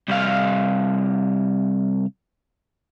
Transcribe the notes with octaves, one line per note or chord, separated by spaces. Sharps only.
C2 F5